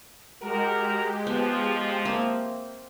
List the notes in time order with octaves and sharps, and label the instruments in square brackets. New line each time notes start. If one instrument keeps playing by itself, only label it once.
[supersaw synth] G#3 G4 [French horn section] F#4 A#4
[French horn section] F3 [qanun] B3
[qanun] A#3 C4 E5